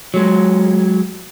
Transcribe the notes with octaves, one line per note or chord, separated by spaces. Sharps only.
F#3 G#3